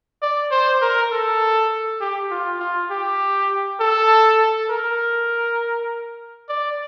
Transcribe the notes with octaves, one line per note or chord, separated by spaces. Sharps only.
D5
C5
A#4
A4
G4
F4
F4
G4
A4
A#4
D5